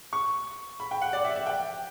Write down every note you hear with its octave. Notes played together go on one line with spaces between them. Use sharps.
C#6
B5
G5
F#5
D5
E5
E5
G5